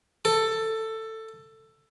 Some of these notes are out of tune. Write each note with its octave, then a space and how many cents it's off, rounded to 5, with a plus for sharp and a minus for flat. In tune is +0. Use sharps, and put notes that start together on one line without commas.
A4 +15